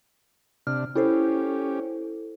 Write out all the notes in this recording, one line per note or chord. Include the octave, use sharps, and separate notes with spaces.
C3 D4 F6
C#4 E4 G4 A4 C5